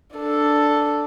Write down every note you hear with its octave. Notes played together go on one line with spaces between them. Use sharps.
D4 A4